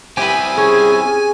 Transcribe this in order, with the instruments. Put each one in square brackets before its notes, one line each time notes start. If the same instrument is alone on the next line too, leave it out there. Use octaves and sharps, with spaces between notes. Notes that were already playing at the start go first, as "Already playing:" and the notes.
[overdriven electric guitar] C4 E4 [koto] G4 B4 [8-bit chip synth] G#5
[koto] C#4 [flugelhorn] G#4
[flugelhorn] G#4